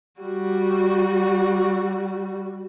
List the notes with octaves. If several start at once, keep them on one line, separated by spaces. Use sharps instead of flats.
G3 F#4